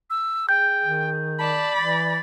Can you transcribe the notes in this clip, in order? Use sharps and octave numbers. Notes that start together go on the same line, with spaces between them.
E6
G#4 G5 G6
D#3
D5 A5 B5
E3 A6